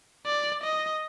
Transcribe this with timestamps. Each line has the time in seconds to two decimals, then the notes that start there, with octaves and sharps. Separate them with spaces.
0.26 D5
0.64 D#5